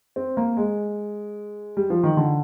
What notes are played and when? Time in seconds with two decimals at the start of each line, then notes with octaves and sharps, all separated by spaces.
0.16 C4
0.37 A#3
0.57 G#3
1.77 G3
1.90 F3
2.03 D#3
2.17 D3